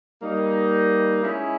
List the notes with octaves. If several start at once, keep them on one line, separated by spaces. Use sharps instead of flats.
G3 A#3 D#4
G#3 C#4 E4 G#4